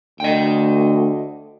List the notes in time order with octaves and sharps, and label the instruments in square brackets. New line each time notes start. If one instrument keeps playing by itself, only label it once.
[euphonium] D2 [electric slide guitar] D#5 G5